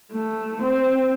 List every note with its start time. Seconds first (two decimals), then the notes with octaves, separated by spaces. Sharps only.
0.13 A3
0.62 C4